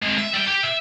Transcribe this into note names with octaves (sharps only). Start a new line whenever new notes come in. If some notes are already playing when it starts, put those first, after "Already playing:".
G#3 C4
E5
G3 G5
G4
E5